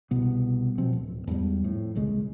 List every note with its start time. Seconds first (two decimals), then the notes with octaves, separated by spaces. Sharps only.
0.11 C2 B2 B3
0.78 B2 F3 C4
0.93 D1
1.27 E2 G#2 G3
1.64 F2 A2
1.95 D#1 C2 C#3 G#3